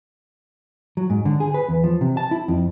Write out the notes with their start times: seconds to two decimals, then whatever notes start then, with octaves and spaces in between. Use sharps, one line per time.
0.97 F#3
1.10 G#2
1.25 D3
1.40 G#4
1.54 B4
1.69 E2
1.84 F3
2.01 C3
2.17 A5
2.31 E4
2.48 F2